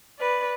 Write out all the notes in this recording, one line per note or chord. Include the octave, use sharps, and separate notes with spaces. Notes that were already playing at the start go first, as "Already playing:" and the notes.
B4 D5